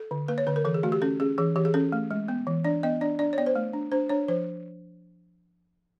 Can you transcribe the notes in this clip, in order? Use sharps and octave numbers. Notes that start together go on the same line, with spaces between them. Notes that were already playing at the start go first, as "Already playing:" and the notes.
Already playing: A4
D3
A#3 B4
C#5
D3 B4
A#4
E3 A4
G#4
A3 F#4
G4
C#4 A4
C#4 G#4
E3 G#4
E3 G4
G#4
C#4 A4
A3
G#3
B3
E3
D4 D5
B3 D#5
D4 D5
D4 D5
C#5
B3 D5
C5
A3
D4
D4 C5
D4 C#5
F3 C5